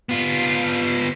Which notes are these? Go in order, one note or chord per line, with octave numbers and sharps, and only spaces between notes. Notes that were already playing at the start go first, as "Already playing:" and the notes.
B3 F4